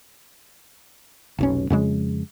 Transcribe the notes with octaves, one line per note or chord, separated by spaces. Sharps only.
F1 B1 C#4
F2 C#3 G#3